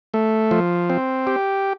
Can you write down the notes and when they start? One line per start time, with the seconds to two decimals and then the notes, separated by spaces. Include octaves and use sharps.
0.14 A3
0.51 F3
0.90 C4
1.27 G4